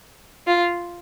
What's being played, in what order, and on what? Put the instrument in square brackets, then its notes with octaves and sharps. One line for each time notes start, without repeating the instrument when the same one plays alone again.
[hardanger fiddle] F4